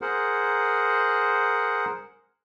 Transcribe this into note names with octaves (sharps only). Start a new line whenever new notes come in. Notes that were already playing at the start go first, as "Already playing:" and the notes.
G#4 A#4 C5 F#5